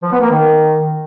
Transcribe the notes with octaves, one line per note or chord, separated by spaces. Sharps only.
F3
B3
A#3
D#3